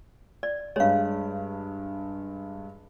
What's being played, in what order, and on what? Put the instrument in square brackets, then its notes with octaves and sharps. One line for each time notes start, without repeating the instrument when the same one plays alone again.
[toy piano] D5
[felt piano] G2 G#3 [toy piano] C#5 F5